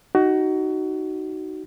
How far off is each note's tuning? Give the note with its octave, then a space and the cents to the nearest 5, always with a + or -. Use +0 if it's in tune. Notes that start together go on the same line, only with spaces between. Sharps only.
D#4 +0 F#4 +20